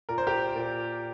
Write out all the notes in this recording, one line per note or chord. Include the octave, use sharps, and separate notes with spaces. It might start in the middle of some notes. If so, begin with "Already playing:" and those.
A#2 A#4
C5
G4 A#4
A#2